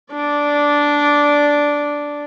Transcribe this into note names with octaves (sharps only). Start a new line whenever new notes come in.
D4 D5